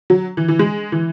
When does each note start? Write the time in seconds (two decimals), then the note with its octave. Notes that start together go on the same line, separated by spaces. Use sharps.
0.10 F#3
0.37 E3
0.48 E3
0.59 G#3
0.92 E3